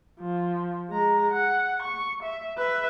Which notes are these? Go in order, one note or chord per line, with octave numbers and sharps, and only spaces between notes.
F3
G#3 A#5
F#5
C#6
E5
B4 E5